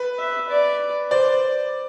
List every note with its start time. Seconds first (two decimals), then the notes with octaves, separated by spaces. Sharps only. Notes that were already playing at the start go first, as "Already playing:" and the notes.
Already playing: B4
0.18 E5
0.49 D5
1.11 C5 D5